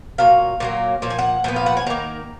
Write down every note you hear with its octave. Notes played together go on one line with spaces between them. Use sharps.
A#2 F#3 F5
A#2 F#3 A#3
A#2 F3
G#5
F#5
A#2 F3 B3
F5
F#5
G#5
D#3 A#3 A#5